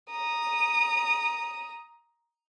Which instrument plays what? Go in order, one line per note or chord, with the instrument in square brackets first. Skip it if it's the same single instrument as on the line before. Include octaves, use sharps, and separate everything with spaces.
[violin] A#5 D#6